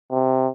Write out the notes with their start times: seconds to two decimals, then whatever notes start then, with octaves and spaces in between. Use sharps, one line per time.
0.11 C3